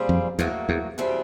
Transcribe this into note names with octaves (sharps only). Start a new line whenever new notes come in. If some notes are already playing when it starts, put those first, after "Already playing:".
Already playing: A#2 G3 C4 F4 G#4
F2
E2 A2 F#3 A#3
E2
B2 G3 C4 E4 G#4